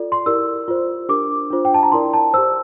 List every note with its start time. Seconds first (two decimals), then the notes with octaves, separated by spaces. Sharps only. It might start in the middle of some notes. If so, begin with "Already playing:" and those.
Already playing: F4 A4 D5
0.12 C6
0.26 E4 G4 A#4 D5 E6
0.68 F4 C5
1.09 D4 G4 A#4 D6
1.50 D4 F4 C5
1.65 G5
1.74 A5
1.83 A#5
1.92 E4 A#4 D5 C6
2.14 A5
2.33 G4 C5 E6